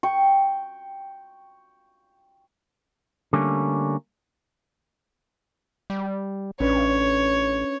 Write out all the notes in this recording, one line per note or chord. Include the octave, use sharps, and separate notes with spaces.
G5 C#6
D3 G3 A3 A#3 C#4
G3
A1 C#4 D4 B4 C#5